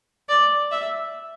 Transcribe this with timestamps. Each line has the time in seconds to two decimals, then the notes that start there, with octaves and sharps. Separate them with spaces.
0.29 D5
0.72 E5